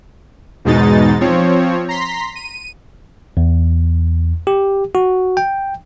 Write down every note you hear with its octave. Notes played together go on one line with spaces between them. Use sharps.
E2 G#2 B2 G#3 D#4 A6
F3 C4 C#5
A#5 C6 B6
D#7
E2
G4
F#4
G5